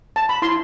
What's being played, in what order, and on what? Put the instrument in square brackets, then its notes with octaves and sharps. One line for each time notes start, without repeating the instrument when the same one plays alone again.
[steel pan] A5
B5
E4 C6